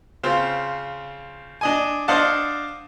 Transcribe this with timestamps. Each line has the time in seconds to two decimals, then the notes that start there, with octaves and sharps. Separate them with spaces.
0.24 C#3 C4 F4
1.61 D4 D#5 G#5
2.08 D4 C5 D#5 F5 F#5 A5